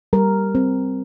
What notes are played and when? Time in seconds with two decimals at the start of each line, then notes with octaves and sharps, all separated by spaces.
0.13 G3 A#4
0.55 C4